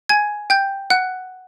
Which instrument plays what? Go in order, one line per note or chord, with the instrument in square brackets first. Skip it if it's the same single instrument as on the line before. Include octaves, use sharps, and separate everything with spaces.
[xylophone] G#5 G#6
G5 G6
F#5 F#6